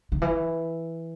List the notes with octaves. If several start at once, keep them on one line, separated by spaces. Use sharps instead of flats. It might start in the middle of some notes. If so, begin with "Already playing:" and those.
D#3
E3